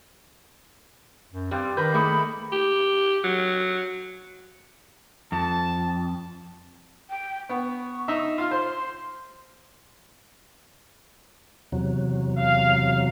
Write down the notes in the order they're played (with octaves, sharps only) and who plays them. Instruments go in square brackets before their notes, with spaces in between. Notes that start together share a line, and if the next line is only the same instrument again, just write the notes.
[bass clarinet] F#2
[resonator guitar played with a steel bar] G2 G3 [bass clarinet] C4
[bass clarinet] D#3 [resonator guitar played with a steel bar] D4 A#4 B4 [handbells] G6
[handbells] A3 G#4 C#7 [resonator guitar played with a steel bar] A#3 D#4 [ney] B5
[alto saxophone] G4
F#3
[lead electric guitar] F2 [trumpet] A5
[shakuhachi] G5
[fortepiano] B3 [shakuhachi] C#6
[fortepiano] D#4 E5
[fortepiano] F4 F5 [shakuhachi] C6
[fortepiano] C5 [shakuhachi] C6
[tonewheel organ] E2 C3 F#3
[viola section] F5